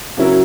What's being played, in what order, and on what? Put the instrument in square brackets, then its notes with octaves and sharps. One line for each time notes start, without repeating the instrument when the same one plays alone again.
[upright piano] C#3 F#3 C#4 E4 A#4 [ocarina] F#4